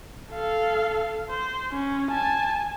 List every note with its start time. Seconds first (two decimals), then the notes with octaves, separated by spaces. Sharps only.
0.32 A4 F5
1.30 C5
1.72 C#4
2.10 G#5 A5